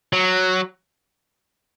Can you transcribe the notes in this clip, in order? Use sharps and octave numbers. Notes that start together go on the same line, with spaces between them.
F#3